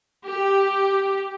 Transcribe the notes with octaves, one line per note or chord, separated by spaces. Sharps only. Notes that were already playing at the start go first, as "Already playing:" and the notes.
G4